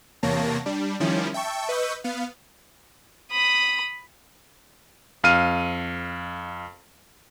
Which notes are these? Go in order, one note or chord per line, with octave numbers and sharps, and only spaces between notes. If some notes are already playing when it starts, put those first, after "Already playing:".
E2 C3 A#3 C#5 A5 A#6
G3 D4
D#3 F3 G3 C#4 E4
E5 G5 A5 C#6
B4 D#5 C#6 E6 G6
B3 F5
B5 D#6
F2 F5 F6 D#7